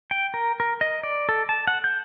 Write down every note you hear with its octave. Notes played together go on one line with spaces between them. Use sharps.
G5
A#4
A#4
D#5
D5
A4
A5
F#5
G6